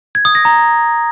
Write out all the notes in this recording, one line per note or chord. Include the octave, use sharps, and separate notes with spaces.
G#6
D#6
A#6
A#5